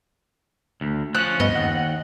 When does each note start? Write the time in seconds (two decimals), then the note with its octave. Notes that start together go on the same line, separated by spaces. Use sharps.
0.81 D2
1.15 F3 C#4 F#6
1.40 G2 B3 D#5
1.55 D#2 F#5